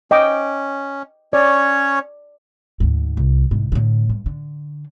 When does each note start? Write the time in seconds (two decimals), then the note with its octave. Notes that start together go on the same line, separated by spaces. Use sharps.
0.11 C#4 D#5 G5 D6
1.33 C#4 C#5 D5
2.80 D2 G#2
3.17 C2
3.51 C2 G#2
3.72 A2 D3
4.09 G2
4.26 D3